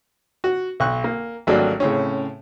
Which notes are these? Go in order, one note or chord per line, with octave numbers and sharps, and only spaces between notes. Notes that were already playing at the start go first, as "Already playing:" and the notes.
F#4
B1 C#6 F#6
A#3
G#1 F#3 G3 A3 A#3 D4
A2 C#3 C4 C#4